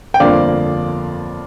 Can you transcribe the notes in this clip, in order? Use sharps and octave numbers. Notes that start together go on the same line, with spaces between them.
G5
G1 F2 D3 F3 A#3 D5 F5